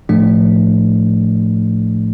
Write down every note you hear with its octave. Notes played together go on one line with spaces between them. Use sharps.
A2 F3 A3 D4